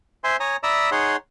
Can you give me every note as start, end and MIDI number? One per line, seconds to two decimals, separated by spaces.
0.24 0.36 72
0.24 0.36 76
0.24 0.36 80
0.24 0.36 84
0.40 0.57 73
0.40 0.57 80
0.40 0.57 82
0.40 0.57 87
0.63 0.90 74
0.63 0.90 76
0.63 0.90 82
0.63 0.90 83
0.63 0.90 87
0.63 0.90 88
0.92 1.16 63
0.92 1.16 68
0.92 1.16 73
0.92 1.16 78
0.92 1.16 84